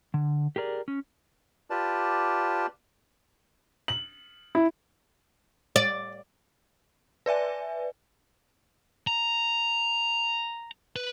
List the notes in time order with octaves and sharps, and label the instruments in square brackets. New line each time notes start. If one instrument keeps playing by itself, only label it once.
[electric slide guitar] D3
G4 G#4 A#4 D5
C#4
[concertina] F4 G4 B4 D5 A5
[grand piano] F#7
E4
[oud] D5
[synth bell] B4 D5 E5 G#5
[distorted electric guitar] A#5
B4